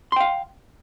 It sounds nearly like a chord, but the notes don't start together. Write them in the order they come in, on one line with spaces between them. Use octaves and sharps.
C6 G5 F5